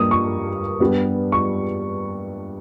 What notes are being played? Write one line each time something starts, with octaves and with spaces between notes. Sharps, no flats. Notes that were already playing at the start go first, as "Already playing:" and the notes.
Already playing: G2 G3 A#3 D#6
C#6
G2 G3 B3
C#6